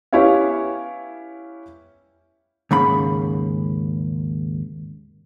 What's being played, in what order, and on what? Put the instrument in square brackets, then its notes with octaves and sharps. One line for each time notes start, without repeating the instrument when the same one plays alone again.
[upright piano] B3 C#4 E4 G4 C#5 F5
[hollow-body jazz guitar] D#2 G#2 C#3 B5